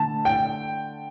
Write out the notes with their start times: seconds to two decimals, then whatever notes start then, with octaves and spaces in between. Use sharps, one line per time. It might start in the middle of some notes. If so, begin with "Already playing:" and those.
Already playing: D3 A3 A5
0.25 G5